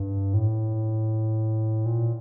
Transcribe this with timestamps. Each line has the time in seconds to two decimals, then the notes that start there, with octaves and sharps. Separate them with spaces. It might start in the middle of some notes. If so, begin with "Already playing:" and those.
Already playing: G2
0.34 A2
1.86 A#2